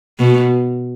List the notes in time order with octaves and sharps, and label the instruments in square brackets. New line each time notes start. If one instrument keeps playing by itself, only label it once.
[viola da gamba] B2